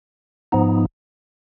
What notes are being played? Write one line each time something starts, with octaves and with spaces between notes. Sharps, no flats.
G#2 F3 B3 D#4